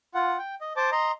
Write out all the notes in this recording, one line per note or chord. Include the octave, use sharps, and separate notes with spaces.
F4 F#5
G5
D#5
C5 A5 D6
D#5 A#5 C6